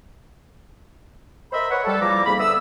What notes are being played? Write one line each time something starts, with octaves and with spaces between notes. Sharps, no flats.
A#4 C5 D#5 E5 B5
B4 C#5 F#5
G3 A4
E2 F3 G3 A#3 A#5 D6
F2 G#2 A#3 B5
D3 B3 E5 D#6 E6